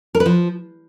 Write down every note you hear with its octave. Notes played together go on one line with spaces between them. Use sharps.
A#4
B4
F3